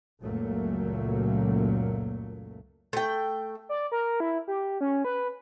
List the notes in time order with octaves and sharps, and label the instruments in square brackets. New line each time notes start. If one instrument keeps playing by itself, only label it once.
[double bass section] C#2 F#2 A#2 F#3 A3 A#3
[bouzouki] A3 G5
[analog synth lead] D5
A#4
E4
G4
C#4
B4